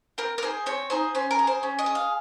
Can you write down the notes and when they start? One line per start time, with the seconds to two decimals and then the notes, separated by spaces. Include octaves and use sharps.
0.18 C4 A#4
0.38 A#4
0.42 D#4 G#4 C5
0.66 C4 C#5
0.90 D#4 G#4 C5
1.15 C#4 C5
1.31 A#4
1.39 G#4
1.47 C5
1.63 C#4
1.79 D#5
1.86 G#4
1.95 F5